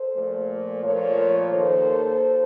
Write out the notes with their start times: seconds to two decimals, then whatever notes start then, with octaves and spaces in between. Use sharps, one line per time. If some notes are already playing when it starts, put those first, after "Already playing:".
Already playing: A4 C5
0.15 A#2 F3 A3
0.83 A#2 F3 A3 A#4 C#5
1.52 D#2 D#3 A#3 A4 C5